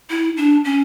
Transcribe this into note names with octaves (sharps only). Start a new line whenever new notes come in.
E4
D4
C#4